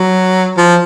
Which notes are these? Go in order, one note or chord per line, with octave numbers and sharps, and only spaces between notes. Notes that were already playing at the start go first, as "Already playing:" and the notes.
Already playing: F#3
F3